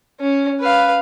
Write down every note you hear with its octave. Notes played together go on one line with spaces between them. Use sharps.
C#4
B4 F5